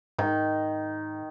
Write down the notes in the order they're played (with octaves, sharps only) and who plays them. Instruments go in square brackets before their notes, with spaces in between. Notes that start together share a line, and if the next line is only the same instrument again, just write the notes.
[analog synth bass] G#2 [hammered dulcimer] D#3